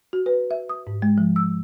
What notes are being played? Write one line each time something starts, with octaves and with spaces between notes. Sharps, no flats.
F#4
B4
E5
D#6
G#2
G#3
F3
E6